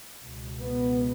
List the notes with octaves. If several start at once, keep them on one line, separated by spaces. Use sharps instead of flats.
C#2 B2
B3